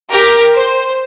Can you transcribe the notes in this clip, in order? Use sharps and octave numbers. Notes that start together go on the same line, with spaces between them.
G4 A#4
C5